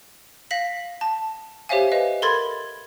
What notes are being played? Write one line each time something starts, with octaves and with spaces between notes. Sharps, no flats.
F5 A#6 B6 F#7
A5
G4 C5 C#5 E5 F5 G#5
B4 D#5 F5
A4 A#4 B5 C6 G#6 A6